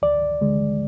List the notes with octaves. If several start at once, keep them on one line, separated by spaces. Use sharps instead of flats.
D2 D5
D3 G#3